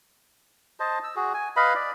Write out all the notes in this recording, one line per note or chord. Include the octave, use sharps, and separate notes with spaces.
C5 D#5 A5
E6
F#4 G#4
G#5
B4 D#5 F5 B5
D5